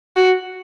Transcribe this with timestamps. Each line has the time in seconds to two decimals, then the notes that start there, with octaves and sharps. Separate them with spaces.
0.17 F#4